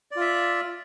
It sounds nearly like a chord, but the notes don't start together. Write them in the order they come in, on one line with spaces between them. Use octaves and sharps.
D5 F4 E5